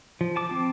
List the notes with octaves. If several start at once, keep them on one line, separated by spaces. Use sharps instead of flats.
F3
A5 D6
C4